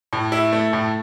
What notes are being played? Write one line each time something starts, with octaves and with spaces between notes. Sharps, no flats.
A2
E4
A3
A2